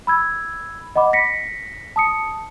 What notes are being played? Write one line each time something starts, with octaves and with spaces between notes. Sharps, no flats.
B5 E6 G#6
D#5 F#5 B5 D6
A#6 B6 C#7
A5 D#6 C#7